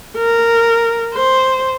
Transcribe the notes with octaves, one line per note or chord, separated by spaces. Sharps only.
A#4
C5